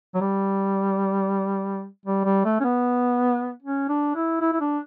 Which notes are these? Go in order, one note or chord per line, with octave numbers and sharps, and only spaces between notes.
F#3
G3
G3
G3
A3
C#4
B3
C#4
D4
E4
E4
E4
D4